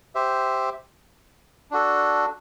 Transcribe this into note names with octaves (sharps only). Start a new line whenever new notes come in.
G4 C5 E5
D4 F#4 A4